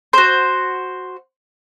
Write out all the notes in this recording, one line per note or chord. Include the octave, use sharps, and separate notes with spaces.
F#4 C5